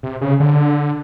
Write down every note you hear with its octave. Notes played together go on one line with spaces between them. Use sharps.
C3
C#3
D3